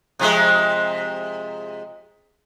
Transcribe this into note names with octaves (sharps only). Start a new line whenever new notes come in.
C3 F3 G#3